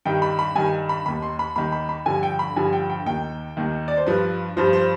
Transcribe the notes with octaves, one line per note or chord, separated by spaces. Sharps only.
G2 D#3 G5
B5
B5
G2 D#3 G#5
B5
D#2 D#3 B5
C6
B5
D#2 D#3 B5
B5
B5
G2 D3 F3 G#5
G5
B5
G2 D3 F3 G#5
G5
G5
D#2 D#3 G5
D#2 D#3
D5
C5
G2 F3 B4
G2 F3 C5
C5